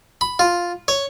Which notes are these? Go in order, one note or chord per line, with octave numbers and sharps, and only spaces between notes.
B5
F4
C#5